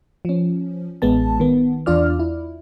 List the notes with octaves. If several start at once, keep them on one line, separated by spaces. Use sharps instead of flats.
F3 C#4
A1 G#3 B3 A5
D#3 B3
E2 D4 F4 D5 F6
E4